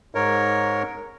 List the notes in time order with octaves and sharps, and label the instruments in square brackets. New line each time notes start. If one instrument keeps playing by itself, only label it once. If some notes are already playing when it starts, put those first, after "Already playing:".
[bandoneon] G#2 A#4 C#5